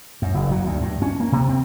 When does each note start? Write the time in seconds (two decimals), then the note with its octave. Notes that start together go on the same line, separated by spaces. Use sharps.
0.22 F#2
0.34 F#1
0.51 F#3
0.65 D2
0.81 G2
1.02 C#4
1.20 A#3
1.32 C3
1.49 C4